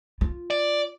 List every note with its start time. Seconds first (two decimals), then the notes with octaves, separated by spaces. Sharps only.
0.21 F4
0.50 D5